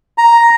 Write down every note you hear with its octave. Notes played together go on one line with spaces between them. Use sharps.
A#5